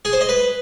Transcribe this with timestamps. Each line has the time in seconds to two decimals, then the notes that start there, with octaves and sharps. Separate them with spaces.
0.05 G#4
0.13 C5
0.21 D#5
0.29 B4